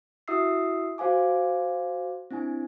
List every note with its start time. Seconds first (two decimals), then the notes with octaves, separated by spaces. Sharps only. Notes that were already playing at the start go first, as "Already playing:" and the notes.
0.28 E4 F#4 E5 D#6 E6 C7
0.98 F#4 C5 F5 G#5 D6
2.31 C4 D4 E4 G#5